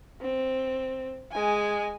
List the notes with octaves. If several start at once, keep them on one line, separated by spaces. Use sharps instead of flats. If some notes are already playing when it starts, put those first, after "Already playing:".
C4
G#3 G#5